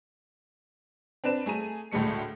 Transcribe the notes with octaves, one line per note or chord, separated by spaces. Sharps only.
C4 D4 B4 E7
A3 G#4 A#5 D#7
D2 A2 G#3 A3 C#7